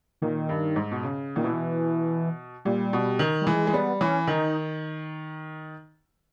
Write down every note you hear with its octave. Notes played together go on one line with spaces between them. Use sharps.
A#2 D#3
G2
G#2
B2
C#3
A#2 D#3
B2 E3
A#2 G3
B2
D#3
G3
E3 G#3
G#3
G3 B3
E3 C#4
D#3 D#4